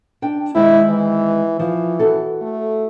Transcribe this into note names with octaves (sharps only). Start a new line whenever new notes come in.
D4 G5
D#3 G#3 C4 E4
E3
E3 F3
E4 F#4 A4
A3